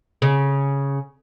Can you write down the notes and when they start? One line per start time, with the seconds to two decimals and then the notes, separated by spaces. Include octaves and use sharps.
0.22 C#3